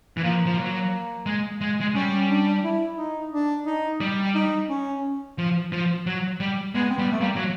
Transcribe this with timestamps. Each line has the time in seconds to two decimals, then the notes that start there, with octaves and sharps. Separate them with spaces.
0.17 E3
0.23 F3 A#3
0.46 F3
0.58 F#3
1.26 G#3
1.61 G#3
1.81 G#3
1.95 G3 C#4
2.29 D4
2.64 E4
2.98 D#4
3.32 D4
3.66 D#4
4.00 G3
4.35 D#4
4.69 C#4
5.38 F3
5.72 F3
6.06 F#3
6.40 G3
6.75 G#3 B3
6.89 C4
6.98 G3 B3
7.11 A3
7.20 G3 A#3
7.36 F#3